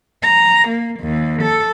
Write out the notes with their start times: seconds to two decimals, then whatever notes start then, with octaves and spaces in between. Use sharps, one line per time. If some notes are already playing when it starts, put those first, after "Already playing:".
0.22 A#5
0.68 A#3
1.00 D#2
1.42 A4